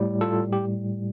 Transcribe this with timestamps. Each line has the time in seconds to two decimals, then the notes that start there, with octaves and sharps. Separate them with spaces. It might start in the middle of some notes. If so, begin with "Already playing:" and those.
Already playing: A2 G3
0.21 F4 A4
0.53 G4